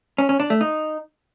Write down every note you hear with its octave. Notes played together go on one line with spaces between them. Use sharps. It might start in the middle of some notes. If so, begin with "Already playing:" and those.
C#4
C#4
D4
A3
D#4